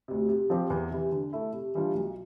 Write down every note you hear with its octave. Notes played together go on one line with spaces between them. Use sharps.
D2 C3
C3
F3 C4 G4
E2
C3 E3
D3
A3 E4
C3
E3 G3 D4 F4
B1